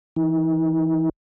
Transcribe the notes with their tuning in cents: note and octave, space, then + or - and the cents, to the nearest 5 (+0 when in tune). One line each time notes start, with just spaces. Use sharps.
E3 +10 D#4 +45